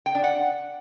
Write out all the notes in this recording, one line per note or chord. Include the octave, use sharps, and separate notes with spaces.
G5
D4
F#5